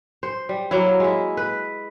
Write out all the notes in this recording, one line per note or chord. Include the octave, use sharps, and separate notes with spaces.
C5
G3
F#3 A#3 E4
G#3 E4
B4